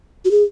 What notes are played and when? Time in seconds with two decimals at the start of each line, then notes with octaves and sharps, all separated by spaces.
0.25 F#4
0.31 G#4